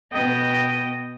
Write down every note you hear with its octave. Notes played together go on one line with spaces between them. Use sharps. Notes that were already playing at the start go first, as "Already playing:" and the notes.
B2 B3 D#5 G5 A#6